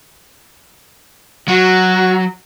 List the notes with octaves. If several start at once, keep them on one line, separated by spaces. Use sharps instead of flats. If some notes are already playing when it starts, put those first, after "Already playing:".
F#3 F#4